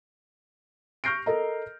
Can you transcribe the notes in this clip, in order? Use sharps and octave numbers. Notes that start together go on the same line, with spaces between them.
C#6 F6 G6 A#6 C7 D7
A4 A#4 D#5 A#5